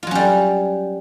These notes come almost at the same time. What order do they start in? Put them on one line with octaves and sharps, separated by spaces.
F4 F#3 C#4 G3